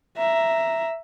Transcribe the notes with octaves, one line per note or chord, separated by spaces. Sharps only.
E5 A#5